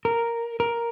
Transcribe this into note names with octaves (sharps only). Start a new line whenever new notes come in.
A#4
A#4